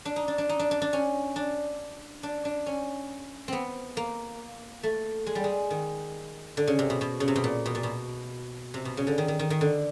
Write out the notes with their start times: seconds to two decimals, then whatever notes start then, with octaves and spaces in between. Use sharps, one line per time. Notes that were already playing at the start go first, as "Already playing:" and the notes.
0.05 D4
0.16 D#4
0.28 D4
0.38 D4
0.49 D#4
0.59 D4
0.71 D4
0.82 D4
0.93 C#4
1.36 D4
2.23 D4
2.45 D4
2.66 C#4
3.48 B3 C4
3.97 A#3
4.83 A3
5.26 G#3
5.35 G3
5.44 G#3
5.71 D#3
6.57 D3
6.67 C#3
6.79 C3
6.90 B2
7.01 B2
7.20 C#3
7.28 C3
7.36 B2
7.44 A#2
7.66 B2
7.75 A#2
7.83 B2
8.74 C3
8.85 B2
8.97 C#3
9.07 D3
9.18 D#3
9.28 D#3
9.39 D#3
9.50 D#3
9.61 D3